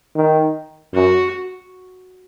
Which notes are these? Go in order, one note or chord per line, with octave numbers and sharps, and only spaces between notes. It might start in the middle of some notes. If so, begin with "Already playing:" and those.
D#3
F#2 F#4